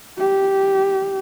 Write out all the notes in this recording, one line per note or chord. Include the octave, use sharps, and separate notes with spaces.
G4